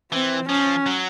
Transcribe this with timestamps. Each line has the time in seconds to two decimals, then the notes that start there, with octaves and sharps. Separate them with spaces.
0.12 E3 C4
0.49 F3 C#4
0.86 F#3